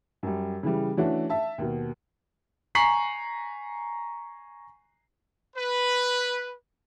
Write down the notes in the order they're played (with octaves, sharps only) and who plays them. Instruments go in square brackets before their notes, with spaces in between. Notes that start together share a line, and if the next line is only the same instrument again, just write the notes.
[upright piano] F#2 G3
C#3 E3 G3
E3 A3 C#4 D4 F#4
E5 A5
D#2 B2
[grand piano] G#5 A#5 C#6 B6 C7 F#7
[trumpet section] B4